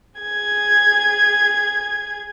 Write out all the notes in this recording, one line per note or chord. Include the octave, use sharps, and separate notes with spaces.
G#4 G#6